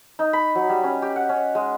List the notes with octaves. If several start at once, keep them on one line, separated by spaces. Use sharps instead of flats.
D#4
B5
F#3
G3
C#4
G4
F#5
C#4
G#3